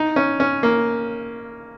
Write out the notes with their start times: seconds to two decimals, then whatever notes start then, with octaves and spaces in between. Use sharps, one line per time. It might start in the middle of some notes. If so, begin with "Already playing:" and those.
Already playing: D#4
0.16 C#4
0.40 C#4
0.63 A#3